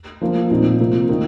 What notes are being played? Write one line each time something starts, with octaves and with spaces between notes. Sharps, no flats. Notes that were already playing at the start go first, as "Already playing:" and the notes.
F3 A#3 F4
A#2 F3 C4 D#4
C3 F3 A#3 F4
D#3 A#3 D#4